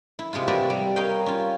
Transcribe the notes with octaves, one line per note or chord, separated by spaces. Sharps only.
E4
C3 G#3 E4 F4
C3 F#4 B4 D5 E5
G3
A#4 C#5 D#5 F5 G5
C#4 F4